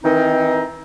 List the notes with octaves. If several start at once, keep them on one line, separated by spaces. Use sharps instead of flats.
D#3 E3 C4 D#4